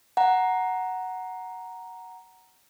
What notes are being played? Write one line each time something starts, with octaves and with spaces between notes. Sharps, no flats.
F#5 A#5